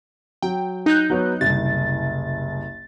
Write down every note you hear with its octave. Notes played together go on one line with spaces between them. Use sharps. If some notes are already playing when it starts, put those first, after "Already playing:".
F#3 G5
D#4 F#6 G6
F#3 B3 C#5
F#1 C2 A6